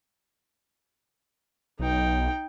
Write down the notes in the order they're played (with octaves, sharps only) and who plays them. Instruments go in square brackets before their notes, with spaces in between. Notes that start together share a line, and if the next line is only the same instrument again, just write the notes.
[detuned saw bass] B1 [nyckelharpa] D#4 G5